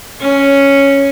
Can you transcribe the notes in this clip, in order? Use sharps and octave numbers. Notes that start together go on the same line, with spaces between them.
C#4